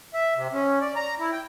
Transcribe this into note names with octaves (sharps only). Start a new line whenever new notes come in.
E5
C3
C#4
D5
A#5
E4
G5